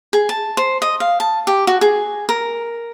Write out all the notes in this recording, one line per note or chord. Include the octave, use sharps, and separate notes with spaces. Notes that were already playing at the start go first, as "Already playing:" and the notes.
G#4
A5
C5
D#5
F5
A5
G4
F#4
G#4
A#4